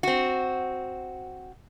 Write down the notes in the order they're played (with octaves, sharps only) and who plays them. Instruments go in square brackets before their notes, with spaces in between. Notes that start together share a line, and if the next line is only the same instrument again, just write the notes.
[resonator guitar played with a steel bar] C4 F#4